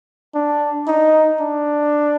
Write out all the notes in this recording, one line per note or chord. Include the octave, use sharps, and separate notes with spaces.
D4
D#4
D4